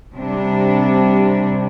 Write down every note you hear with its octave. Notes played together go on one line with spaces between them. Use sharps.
C3 G3 D4